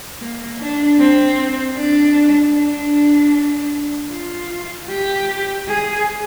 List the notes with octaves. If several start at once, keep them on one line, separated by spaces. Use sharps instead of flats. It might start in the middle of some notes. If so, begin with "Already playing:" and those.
A#3
D4
C4
D4
D4
F4
G4
G#4